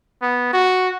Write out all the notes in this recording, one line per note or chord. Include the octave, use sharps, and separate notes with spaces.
B3
F#4